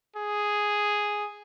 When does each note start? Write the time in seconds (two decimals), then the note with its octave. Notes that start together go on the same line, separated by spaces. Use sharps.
0.16 G#4